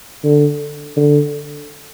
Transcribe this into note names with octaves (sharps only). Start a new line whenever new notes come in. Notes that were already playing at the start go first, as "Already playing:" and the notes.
D3
D3